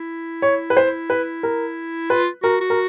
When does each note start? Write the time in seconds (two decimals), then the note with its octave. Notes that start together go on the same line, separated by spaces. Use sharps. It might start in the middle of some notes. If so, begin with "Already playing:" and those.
Already playing: E4
0.42 C#5
0.70 B4
0.77 C5
1.10 B4
1.43 A#4
2.10 F4 B4
2.43 F#4 A#4
2.61 F#4
2.70 A#4